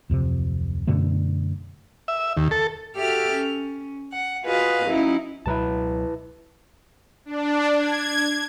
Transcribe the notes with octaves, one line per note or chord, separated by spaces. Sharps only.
D1 F2 C3
F#2 B2 D3 A3
E5
D#2
A4
F#4 G4 A4 E5 F6
C#4
F#5
F4 F#4 G#4 B4 D#5 F5
F#3 C#4 D#4 E4
C#2 B2 F#3 E4 B4 A5
D4
G#6